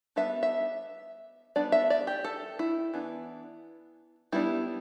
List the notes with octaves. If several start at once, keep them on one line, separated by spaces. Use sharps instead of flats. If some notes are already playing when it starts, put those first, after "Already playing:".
G3 B3 D4 E5
E5
G3 B3 D4 D5
E5
D5
G4
A4
E4
E3 B3 D4
G3 B3 D4 E4